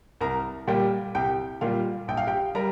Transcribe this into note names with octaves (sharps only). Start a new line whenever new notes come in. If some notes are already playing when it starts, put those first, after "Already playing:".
C2 A#4 A#5
A#2 G3 G4 G5
C2 G4 G5
A#2 G3 F4 F5
A#1 G5
F5
G4 G5
G3 A#4 A#5